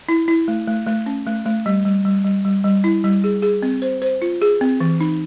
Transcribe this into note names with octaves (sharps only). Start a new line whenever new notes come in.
E4
E4
A3
A3
A3
C#4
A3
A3
G3
G3
G3
G3
G3
G3
E4
G3
G#4
G#4
C4
C5
C5
F4
G#4
C4
E3
D#4